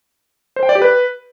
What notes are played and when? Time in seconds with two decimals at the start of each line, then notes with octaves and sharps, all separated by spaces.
0.56 C5
0.63 G5
0.69 D5
0.75 G4
0.82 B4